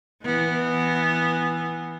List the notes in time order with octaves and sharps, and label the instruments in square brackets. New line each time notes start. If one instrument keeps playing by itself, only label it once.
[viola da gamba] E3 B3